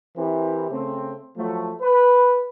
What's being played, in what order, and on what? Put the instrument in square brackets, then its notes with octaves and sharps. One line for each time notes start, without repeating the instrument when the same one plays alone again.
[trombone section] E3 C4 E4 G4 A#4
C#3 A3 C4
F3 F#3 A3
B4